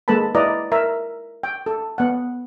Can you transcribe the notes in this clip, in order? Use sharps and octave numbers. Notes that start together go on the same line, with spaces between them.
G#3 A#3 A4 B4 A5 B5
E4 B4 D5 D#5 A#5
A#4 E5 A#5
G5
A4
B3 F#5